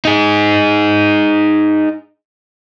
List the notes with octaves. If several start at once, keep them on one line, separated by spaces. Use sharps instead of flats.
D#4 G#4